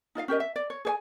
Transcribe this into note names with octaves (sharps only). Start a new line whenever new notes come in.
D#4 F4 D#5 F5
C#4 G4 A#4 D#5
E5
D5
C#5
G#4 C#5 G#5